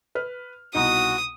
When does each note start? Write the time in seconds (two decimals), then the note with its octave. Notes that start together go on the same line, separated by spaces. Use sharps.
0.15 B4 F6
0.75 C2 B2 D#4 F#4 D#6